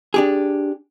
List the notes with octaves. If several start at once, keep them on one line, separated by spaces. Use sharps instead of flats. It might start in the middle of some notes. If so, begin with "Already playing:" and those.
D4 G4 G#4